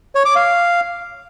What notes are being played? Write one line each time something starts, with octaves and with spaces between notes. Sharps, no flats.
C#5
D6
F5